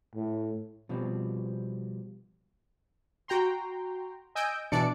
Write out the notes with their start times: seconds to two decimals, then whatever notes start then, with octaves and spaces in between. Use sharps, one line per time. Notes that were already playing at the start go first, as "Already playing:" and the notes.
0.15 A2
0.89 B2 F3 G3 C4
3.28 F#4 G5 A#5 C6
4.35 D#5 G#5 E6 G6 D7
4.72 B2 E3 D4 D5 C#7 D7